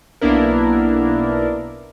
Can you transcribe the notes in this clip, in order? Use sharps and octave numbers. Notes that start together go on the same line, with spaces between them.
B1 A#3 B3 D4 E4 A#4